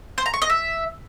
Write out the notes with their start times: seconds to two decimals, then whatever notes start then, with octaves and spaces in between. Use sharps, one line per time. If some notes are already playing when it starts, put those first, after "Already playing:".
0.18 C5
0.26 A#5
0.34 C#6
0.42 D#5
0.50 E5